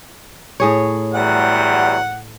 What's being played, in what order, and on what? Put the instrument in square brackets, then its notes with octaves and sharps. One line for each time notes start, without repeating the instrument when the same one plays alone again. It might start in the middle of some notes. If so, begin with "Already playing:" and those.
[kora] A2 G#4 C#5
[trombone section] E2 F#3 G3 [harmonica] F#5